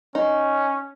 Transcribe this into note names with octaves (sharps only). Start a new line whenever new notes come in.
C#4 D#4